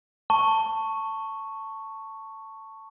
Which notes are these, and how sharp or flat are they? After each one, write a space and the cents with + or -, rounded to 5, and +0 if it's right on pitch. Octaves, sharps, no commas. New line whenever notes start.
A5 +15 C#6 +0